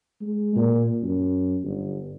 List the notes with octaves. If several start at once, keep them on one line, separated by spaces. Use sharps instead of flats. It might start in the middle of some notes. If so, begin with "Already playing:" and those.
G#3
A#2
F#2
G1